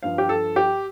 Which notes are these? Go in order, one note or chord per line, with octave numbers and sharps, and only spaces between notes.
G2 F3 F5
G4
A4
G4